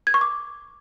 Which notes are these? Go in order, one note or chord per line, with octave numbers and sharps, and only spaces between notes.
G#6
C#6
D6